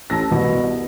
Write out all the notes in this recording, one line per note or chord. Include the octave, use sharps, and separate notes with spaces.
A1 A5 E6 A#6
C2 B2